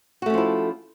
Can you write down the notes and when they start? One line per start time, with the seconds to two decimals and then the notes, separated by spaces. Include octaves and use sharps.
0.22 F#4
0.26 A3
0.30 C#4
0.34 F3
0.38 E4